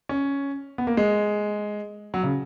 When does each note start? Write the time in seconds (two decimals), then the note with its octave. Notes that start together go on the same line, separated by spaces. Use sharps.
0.09 C#4
0.78 B3
0.87 A#3
0.97 G#3
2.14 F#3
2.24 C#3